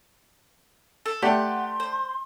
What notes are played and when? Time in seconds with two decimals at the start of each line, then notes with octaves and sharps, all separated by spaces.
1.06 A4
1.22 A3 G4 D5 F#5 C6
1.80 C5